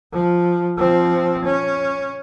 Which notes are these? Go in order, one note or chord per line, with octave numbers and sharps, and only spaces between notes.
F3
F3 C4
C#4